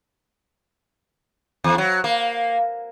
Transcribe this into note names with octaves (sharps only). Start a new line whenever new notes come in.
E2
F#3
A#3